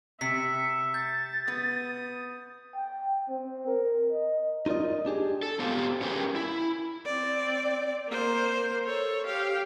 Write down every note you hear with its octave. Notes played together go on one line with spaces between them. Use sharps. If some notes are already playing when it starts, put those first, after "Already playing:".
C3 E5 B6 C#7
G6 A6
B3 B4 D#6
G5
C4
A#4
D#5
D#4 F4 A#4 D5 D#5
D4 G4 G#4
A4
B3 C4 F4 G4
C#4 G4 G#4 A#4 B4 G5
E4
C4 D5
A#3 C5
A4 C#5
G4 F5